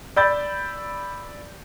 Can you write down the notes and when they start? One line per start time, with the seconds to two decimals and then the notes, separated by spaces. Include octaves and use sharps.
0.16 D5 B5 E6 G6 A6